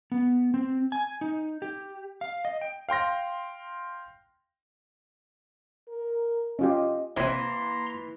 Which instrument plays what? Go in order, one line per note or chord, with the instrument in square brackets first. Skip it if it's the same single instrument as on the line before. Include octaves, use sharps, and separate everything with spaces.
[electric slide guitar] B3
C4
G#5
D#4
G4
F5
D#5
G5
[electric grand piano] F5 G5 C6 A#6
[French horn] A#4
[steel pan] C#4 F4 G4 [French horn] D#5
[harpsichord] C3 C4 [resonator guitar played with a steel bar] E3 [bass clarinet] A#3 [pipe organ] A#5 C6